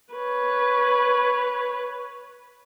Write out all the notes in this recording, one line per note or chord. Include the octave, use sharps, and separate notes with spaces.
B4 C#5